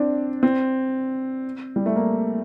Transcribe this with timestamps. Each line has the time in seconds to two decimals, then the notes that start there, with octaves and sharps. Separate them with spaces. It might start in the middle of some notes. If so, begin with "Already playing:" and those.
Already playing: C4 D4
0.43 C4
1.76 G3
1.86 A3
1.96 A#3